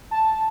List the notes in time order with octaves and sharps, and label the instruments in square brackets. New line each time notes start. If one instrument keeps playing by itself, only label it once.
[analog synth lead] A5